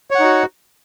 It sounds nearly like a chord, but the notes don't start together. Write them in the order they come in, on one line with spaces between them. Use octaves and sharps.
C#5 F#5 D#4 F#4